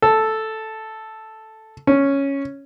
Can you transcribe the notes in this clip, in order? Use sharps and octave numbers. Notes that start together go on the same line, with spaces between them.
A4
C#4